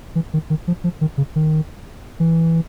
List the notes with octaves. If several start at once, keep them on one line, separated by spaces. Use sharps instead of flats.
E3
D#3
D#3
F3
F3
D#3
C#3
D#3
E3